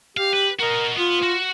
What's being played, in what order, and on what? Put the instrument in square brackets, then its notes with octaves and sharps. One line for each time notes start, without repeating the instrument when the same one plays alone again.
[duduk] G4 [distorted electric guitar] F5
[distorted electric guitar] B4
[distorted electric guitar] F#4 D#5 [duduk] A#4
[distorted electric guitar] B3 [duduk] F4
[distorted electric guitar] F#4